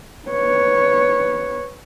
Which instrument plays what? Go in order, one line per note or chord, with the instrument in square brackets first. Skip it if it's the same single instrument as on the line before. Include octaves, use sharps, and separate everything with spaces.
[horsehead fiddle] B4 C#5